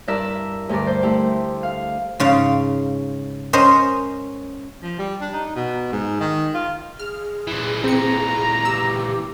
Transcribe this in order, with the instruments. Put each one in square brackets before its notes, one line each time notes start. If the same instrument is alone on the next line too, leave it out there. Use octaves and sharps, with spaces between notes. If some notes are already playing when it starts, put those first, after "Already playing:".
[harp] G2 E4 A#4 D5 E5 E6
D2 G2 A#4 D5
C5
A3 E4 G4
F5
[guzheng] G#2 C#3 F5
C#4 A#4 C5 D#5
[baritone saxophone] F3
G3
D4
D#4
B2
G#2
D#3
F4
[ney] G#4 [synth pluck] F6
[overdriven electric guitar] A#2 E3
[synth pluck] C4 C#7 [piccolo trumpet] A#5
[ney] G4 [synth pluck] E6